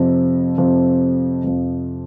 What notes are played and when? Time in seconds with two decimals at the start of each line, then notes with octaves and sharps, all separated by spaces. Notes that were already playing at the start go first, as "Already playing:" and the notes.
Already playing: F2 C3 F3
0.58 F2 C3 F3
1.44 F2 C3 F3